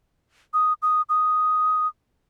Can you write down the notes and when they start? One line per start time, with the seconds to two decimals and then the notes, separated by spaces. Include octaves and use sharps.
0.54 D#6
0.82 D#6
1.09 D#6